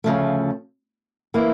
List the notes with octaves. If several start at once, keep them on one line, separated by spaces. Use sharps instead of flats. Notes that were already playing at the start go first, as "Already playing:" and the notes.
D2 C#3 F3 A3
E3 A#3 E4